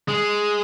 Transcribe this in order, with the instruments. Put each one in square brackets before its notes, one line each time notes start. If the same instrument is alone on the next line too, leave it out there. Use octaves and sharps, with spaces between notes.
[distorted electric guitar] G#3